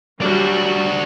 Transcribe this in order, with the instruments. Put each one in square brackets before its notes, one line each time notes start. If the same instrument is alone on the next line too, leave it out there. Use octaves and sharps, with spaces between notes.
[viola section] F#3 G3 [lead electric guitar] D4 F#4